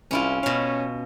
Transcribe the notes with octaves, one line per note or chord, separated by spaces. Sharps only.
C2 C#4 E4 F4
B2 C#4 F5